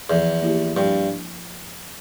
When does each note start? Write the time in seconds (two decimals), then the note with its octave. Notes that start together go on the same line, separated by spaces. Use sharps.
0.09 E2 F3
0.42 A#3 E4 G4
0.76 G2 F3